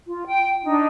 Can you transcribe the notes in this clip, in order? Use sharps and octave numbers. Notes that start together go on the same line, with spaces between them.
F4
G5
D4 D#4